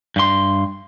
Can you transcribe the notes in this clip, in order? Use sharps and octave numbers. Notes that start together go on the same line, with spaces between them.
G2 C6